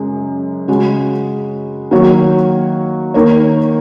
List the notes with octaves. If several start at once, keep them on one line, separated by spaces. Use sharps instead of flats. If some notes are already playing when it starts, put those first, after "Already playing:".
Already playing: F#2 C#3 G#3
C#3 G#3 F#4
D#3 F#3 A#3 F#4 C#5
D#3 A#3 D#4 A#4 C#5